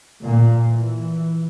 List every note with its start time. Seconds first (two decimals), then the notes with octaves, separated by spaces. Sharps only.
0.24 A#2
0.68 E3